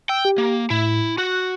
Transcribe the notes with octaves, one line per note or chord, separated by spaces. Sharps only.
G5 E6
G4
A#3
A2 E4
F#4 F#6